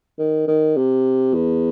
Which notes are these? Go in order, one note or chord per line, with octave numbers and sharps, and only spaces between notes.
D#3
D#3
C3
E2